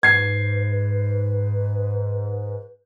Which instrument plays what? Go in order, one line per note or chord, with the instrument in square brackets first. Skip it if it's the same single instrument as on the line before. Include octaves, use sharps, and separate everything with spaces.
[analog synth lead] G#2 [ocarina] B4 [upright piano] G#6 C7